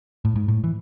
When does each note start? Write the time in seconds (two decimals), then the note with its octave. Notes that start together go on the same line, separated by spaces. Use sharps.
0.25 A2
0.36 G#2
0.48 A2
0.64 E3